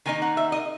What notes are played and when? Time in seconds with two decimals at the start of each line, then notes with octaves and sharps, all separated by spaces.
0.06 D#3 A#3 D#4 G#5
0.22 F#5
0.37 E5
0.52 D#5